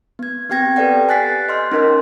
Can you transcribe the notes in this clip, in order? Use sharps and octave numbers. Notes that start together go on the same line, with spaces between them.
B3 G#6
B3 C4 G4 G5 G#6 A#6
G4 A4 B4 D5 F#5 G5
G#5 F#6 A6 B6 C7
D#5 C6 F6 G6
C#4 D#4 A#4 D#5 C6